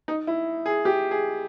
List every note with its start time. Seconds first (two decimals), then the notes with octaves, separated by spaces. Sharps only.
0.08 D#4
0.27 E4
0.66 G#4
0.85 G4
1.11 G#4